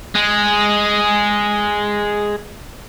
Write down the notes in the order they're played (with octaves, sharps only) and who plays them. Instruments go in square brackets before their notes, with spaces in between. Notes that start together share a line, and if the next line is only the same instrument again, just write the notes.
[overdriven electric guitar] G#3 G#4